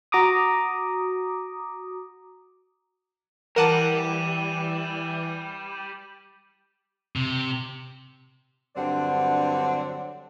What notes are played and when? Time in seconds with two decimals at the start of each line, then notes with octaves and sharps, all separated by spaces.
0.12 F#4 A#5 D6 D#6
3.56 E3 G3 A#4 F#5 A5 D6 D#7 E7
7.16 C3
8.76 G2 D3 F#3 C4 D5 F#5